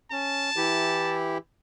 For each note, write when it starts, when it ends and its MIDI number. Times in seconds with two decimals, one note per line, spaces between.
0.12 0.50 61
0.12 1.16 81
0.56 1.38 52
0.56 1.38 64
0.56 1.38 67